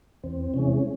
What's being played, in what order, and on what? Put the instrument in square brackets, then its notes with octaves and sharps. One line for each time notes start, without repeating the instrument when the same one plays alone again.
[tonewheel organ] E2 C4
C3 E3 G#3 C#4